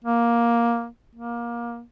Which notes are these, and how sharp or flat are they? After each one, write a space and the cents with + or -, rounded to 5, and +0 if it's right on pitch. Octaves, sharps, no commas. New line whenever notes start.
A#3 +10
A#3 +20